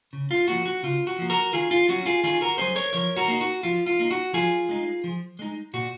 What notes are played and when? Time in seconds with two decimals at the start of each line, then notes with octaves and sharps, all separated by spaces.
0.13 C#3
0.31 F4
0.48 F3 A#3 F#4
0.66 F#4
0.83 C#3 F4
1.07 F#4
1.18 F3 A#3
1.30 F#4 A#4
1.53 D#3 F4 G#4
1.71 F4
1.89 F#3 C#4 F#4
2.06 F4 G#4
2.23 D#3 F4 G#4
2.41 F#4 A#4
2.58 F#3 C#4 G#4 C5
2.76 A#4 C#5
2.93 F3 A#4 C#5
3.17 F#4 A#4
3.28 A#3 D#4
3.41 F#4
3.63 F3 F4
3.86 F4
3.99 A#3 D#4
4.11 F#4
4.33 F3 F4 G#4
4.69 G#3 D#4
5.04 F3
5.39 G#3 D#4
5.73 A#2 F#4